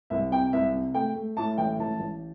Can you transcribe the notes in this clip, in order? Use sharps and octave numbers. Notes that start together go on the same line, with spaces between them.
C2 E5
C3 G5
C2 E5
C3
A3 G5
A3
A2 A5
A1 G5
A1 A5
A1